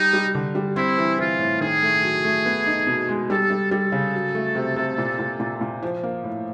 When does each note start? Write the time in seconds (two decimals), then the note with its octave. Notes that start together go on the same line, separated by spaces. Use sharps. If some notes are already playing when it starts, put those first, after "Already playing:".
Already playing: G3 D#4
0.13 G3
0.35 D3
0.55 G3
0.76 C4 E4
0.98 E3
1.19 E3 F4
1.39 A2
1.61 D#3 G#4
1.82 A3
2.02 F#3
2.24 A3
2.46 B3
2.66 D#4
2.87 B2
3.09 G#3
3.29 G3 A4
3.50 G3
3.71 G3 A4
3.92 C#3
4.14 F#3
4.35 A3
4.55 C3
4.76 C3
4.98 A#2
5.19 A#2
5.40 A#2
5.61 A#2
5.83 F3
6.03 A#3
6.24 A2